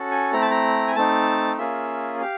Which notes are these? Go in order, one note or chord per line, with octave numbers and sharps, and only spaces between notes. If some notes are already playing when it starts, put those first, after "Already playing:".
Already playing: C#4 F#4 A4
G#5
A3 C4 E4 A#5
A5
A#5
G#5
A3 C4 D#4 A5
A#3 C#4 F4 G#4 E5
G4 F5